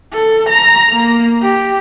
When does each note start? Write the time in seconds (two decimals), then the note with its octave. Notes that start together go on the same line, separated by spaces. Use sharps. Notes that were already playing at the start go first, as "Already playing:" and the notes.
0.13 A4
0.50 A#5
0.93 A#3
1.42 G4